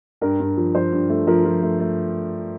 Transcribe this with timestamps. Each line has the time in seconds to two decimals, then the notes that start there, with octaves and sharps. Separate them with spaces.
0.21 G2 A#4
0.40 G2
0.57 F3
0.75 F3 C5
0.92 G2
1.10 A3
1.27 F3 A#4
1.45 F3
1.62 A3
1.80 A3